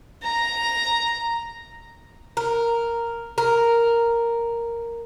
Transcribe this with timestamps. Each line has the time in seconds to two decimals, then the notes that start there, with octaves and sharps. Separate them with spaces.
0.23 A#5
2.37 A#4
3.38 A#4